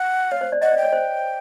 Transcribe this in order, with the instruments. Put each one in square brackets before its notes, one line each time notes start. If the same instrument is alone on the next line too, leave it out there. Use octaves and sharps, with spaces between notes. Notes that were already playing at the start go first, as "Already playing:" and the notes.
Already playing: [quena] F#5
[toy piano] C#5 [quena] F5
[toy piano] C5
D5
[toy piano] D#5 [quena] F#5
[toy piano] D5
[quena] G5
[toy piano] C#5
C5